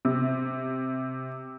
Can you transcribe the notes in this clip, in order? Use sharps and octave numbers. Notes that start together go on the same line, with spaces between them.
C3